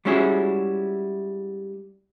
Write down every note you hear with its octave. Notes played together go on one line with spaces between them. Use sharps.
G3 G#3 C#4 E4 F#4 G#4